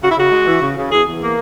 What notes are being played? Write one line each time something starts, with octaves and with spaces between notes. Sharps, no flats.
C#3 F#4
E4
C#3 F#4
G#3
E3
C#3
C#3
E2 G#4
E2
A#3